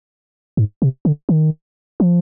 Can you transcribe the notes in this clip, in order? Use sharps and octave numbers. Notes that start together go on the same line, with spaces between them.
G#2
C3
D3
D#3
F3